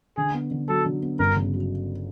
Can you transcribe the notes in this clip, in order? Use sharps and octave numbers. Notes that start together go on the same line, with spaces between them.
D3 G#4
B3
D3
F#3 A4
D3
B3
G1 A#4
C#3
F#3